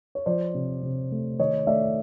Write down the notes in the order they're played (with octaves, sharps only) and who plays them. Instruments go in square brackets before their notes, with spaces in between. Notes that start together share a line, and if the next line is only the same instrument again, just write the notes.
[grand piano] C#5
F3 C5 D5
C3
C3
A3
D#3 C#5 D#5
A3 D5 E5